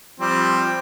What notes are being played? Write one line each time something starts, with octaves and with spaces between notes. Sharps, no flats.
F3 G3 C4